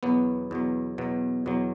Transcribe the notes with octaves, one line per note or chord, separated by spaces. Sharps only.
E2 B2 F#3 B3
E2 B2 F#3
E2 B2 F#3
E2 B2 F#3